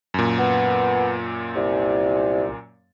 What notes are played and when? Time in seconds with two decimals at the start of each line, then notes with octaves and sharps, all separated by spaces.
0.14 F#2 A#2
0.38 B3
1.55 C2